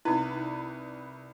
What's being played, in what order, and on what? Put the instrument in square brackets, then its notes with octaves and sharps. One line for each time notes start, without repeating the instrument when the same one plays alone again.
[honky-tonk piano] C2 B4 [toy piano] D#4 E4